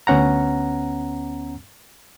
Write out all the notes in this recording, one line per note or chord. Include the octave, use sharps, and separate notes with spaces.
D2 B3 C#4 F#5 A#5